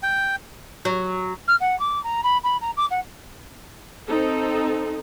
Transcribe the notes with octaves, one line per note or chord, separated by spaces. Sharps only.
G5
F#3
F6
F#5
D6
A#5
B5
B5
A#5
D6
F#5
C4 D#4 A4